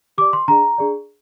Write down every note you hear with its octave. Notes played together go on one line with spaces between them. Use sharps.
G4 D5 D6
C6
D4 G#4 D5 A#5
D4 G#4 D5